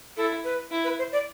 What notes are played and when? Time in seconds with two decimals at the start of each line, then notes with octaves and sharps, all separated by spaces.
0.17 E4 A4
0.44 B4
0.71 E4
0.84 B4
0.98 C5
1.12 D5